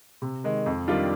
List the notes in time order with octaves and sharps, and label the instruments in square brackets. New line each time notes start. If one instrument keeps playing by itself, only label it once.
[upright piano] C3
D#3 G#3
F2
D#3 G3 D4 F4